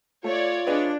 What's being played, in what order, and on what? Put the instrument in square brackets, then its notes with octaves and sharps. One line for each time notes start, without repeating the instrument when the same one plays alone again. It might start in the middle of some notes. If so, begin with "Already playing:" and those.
[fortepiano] A3 [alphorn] F4 [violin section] C#5 D5
[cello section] D4 [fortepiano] G#4 B4 D#5